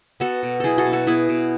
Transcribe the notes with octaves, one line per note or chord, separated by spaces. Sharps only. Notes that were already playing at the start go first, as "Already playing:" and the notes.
B3 F#4 A4
B2
F#3 E4 G#4 A4
F#4 A4
B2
F#4 A4
B3 E4 G#4
B2